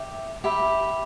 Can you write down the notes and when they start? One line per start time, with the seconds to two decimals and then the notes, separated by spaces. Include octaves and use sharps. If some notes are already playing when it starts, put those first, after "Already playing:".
Already playing: G4 E5
0.44 G4 E5 B5